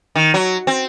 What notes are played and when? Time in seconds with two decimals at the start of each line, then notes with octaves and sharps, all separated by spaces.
0.15 D#3
0.34 F#3
0.67 C4